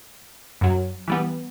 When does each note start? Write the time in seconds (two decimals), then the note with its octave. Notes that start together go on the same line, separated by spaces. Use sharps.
0.61 F#2 F#3
1.08 E3 G3 B3